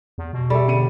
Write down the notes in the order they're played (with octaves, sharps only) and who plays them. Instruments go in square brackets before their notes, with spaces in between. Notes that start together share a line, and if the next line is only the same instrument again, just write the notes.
[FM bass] E2
B2
[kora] G3 [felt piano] G#4 A4 E5
[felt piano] G1 C#7 D#7